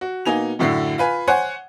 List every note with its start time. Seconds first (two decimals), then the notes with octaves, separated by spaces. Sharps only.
0.01 F#4
0.25 B2 A#3 D#4 G#5 F7
0.59 F#2 A2 D3 E4 C7
0.98 F4 B4 G#5
1.27 C5 C#5 F#5 G#5